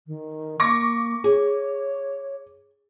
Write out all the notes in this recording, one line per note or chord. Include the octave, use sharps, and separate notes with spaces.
D#3
A#3 C#6 D6 A#6
G#4 C#5